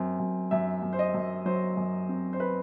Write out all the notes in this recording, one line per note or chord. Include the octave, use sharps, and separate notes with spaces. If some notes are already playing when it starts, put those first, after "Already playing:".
Already playing: F#2 C4
F#2
F#2 E5
F#2
C5
D#5
F#2
F#3 C5
F#2
C4
C5
B4